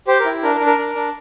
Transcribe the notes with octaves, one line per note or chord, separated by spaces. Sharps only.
G4 C5
A#4
E4
D4 A#4
A#4
D4
A#4
D4
D4